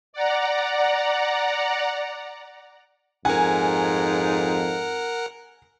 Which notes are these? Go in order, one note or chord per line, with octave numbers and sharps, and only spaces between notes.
D5 F#5 A#5
F2 G#2 A#4 F#5 G#5